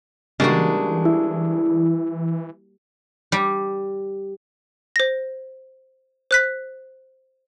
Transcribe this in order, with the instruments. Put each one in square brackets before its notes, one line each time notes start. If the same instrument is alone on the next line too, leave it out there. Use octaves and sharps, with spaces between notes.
[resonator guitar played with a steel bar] C#3 G#3 D4 [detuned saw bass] E3 [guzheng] G3 A#3 F#4
[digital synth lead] E4
[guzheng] G3
[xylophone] C5 A#6
C5 F#6 B6